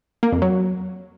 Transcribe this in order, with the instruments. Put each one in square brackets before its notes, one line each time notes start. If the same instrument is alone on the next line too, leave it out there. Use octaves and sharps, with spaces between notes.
[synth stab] A#3
F2
F#3